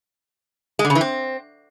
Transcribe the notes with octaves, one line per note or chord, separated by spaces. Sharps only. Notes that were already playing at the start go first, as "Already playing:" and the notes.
G#3
D3
C#3
E3
C4